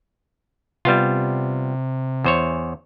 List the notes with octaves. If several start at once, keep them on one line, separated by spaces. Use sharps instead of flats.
C3 G3 B3 F4
E2 C5 C#5